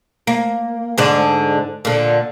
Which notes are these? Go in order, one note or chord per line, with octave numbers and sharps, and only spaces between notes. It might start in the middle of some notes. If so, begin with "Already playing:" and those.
A#3
G#2 D3 D4
A#2 D3